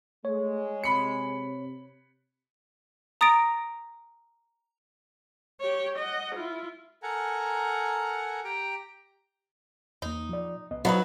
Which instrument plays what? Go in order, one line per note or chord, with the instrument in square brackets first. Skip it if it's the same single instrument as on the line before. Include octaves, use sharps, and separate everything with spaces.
[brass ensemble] G#3 [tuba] A3 [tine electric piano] C#5
[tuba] C3 [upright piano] B5 C#7
[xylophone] A#5 D#6 A6 A#6 D7
[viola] G4 C#5
D#5 F#5
E4 F4
[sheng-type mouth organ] A4 A#4 F#5 G#5 A#5
G4 G5 A#5
[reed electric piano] E2 A#3 [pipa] D#4
[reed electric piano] F3 D5
C2 B3 D#5
[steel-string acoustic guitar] F#3 [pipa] B3 D#4 B4 [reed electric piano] C5 D5 F5